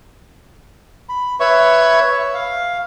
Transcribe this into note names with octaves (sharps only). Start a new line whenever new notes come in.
B5
B4 C#5 E5 C#6
F5